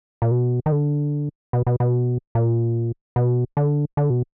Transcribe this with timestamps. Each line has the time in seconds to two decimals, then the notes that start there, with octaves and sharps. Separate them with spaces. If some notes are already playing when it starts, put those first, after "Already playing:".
0.22 A#2
0.31 B2
0.66 D#3
0.72 D3
1.53 B2
1.67 B2
1.80 B2
2.35 A#2
3.16 B2
3.57 D3
3.97 D3
4.10 B2